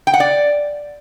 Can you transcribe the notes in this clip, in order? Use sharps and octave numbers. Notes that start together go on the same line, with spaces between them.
G5
F#5
D5